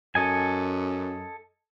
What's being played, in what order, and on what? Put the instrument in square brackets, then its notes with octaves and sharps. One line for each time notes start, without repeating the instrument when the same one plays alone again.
[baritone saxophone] F#2 [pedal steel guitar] A4 D#5 G#5